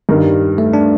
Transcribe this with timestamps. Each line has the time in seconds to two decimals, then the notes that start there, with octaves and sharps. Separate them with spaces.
0.09 G2 D#3 G3
0.58 A3
0.73 D4